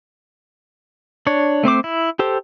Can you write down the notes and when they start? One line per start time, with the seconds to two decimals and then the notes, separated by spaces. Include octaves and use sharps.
1.27 D4 C#5
1.63 A3 C4 C5 D6
1.84 E4
2.19 G4 A4 C5